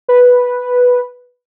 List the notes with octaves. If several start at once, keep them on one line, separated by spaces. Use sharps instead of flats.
B4